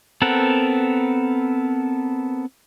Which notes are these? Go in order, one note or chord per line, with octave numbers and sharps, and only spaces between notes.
B3 C4 A4 A#4 F#5